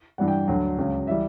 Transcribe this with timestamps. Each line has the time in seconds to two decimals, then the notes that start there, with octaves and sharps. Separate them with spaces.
0.18 G2 E3 G3 F#5
0.28 G5
0.48 D2 D3 F#3
0.78 C#2 C#3 F#3
1.07 E3 G3 E5